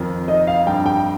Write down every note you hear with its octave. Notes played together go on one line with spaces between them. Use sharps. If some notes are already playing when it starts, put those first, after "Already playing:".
Already playing: F2 D#3
D#4 D#5
F5
G2 G5
G5